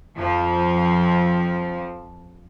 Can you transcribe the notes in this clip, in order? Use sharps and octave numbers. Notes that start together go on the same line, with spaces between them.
F2 F3